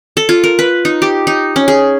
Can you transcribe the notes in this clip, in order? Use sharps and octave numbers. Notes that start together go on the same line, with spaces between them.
A4
F4
A#4
B4
D#4
G4
D#4
C#4
G#4